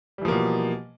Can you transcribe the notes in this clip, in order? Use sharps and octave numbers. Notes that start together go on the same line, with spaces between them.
B2 E3 F3 G3 A#3